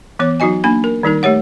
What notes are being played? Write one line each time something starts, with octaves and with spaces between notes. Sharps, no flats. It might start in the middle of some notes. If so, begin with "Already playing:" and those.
E3 B3 C#5 D6
F#3 D#4 F#4 D#5 G#5
A#3 D4 G#5 B5
A#4
D#3 G3 D#4 A#4
A3 G4 C#5 F#5